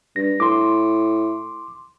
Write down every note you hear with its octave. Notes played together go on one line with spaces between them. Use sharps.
G2 A#6
A2 C6 D6